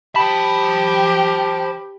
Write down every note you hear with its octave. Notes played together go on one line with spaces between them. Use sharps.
G4 C5 A5 B5